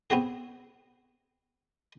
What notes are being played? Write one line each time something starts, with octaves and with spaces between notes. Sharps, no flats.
B3 C4 F#4 G#4